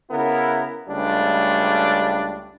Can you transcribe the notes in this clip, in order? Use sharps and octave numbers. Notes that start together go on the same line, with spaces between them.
C#3 B3 E4 A#4
C#2 G3 A3 D4